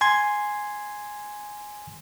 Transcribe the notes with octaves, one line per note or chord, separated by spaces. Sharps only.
G#5 C6 G#6